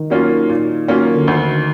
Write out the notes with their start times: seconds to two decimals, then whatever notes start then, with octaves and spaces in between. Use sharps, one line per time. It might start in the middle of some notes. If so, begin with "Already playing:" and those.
Already playing: D#3
0.10 F#3 A#3 C#4 F4
0.49 A#2
0.88 F#3 A#3 C#4 F4
1.15 D3
1.27 D2 D#3